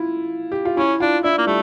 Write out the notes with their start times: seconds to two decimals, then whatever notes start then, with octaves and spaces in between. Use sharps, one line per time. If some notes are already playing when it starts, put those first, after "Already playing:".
Already playing: E4 F4
0.52 G4
0.65 F4
0.77 C#4 E4
1.00 D4 F4
1.24 D4 E4
1.38 A#3
1.47 G3 A3